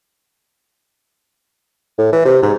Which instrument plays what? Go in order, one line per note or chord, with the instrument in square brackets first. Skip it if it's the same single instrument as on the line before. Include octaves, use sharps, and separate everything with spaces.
[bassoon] A2
E3
C3
G#2